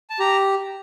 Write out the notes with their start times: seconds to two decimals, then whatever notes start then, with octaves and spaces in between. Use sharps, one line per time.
0.10 A5
0.19 G4 A#5